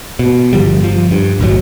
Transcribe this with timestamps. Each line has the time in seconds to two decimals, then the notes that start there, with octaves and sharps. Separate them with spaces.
0.19 B2
0.53 G1 D3 F3 G3
0.80 G1 F3
1.11 G2
1.40 A#1 D#2 G#2 F#3